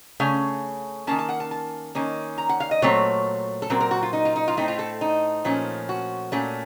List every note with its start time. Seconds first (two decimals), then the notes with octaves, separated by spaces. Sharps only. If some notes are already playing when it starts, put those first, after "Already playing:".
0.20 C#3 A3 C#4 F5
1.07 D#3 A#3 C#4 A5
1.19 A5
1.29 F#5
1.40 A5
1.51 A5
1.95 D#3 A#3 C#4
2.38 A#5
2.49 F#5
2.60 F5
2.71 D#5
2.82 A#2 F#3 A3 C4 C#5
3.62 A4
3.70 A#2 F#3 C4 A#4
3.81 A#4
3.91 F#4
4.03 F4
4.13 D#4
4.25 F4
4.36 D#4
4.48 F4
4.57 A2 A3 C4 D#4
4.68 F4
4.79 A4
5.01 D#4
5.45 A#2 F3 A3 C#4
5.89 F#4
6.32 A#2 A3 C#4